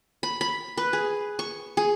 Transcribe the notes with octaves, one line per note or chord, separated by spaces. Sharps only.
B5
B5
B4
G#4
C#6
G#4